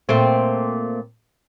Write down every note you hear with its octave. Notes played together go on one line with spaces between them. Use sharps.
A#2 A3 C4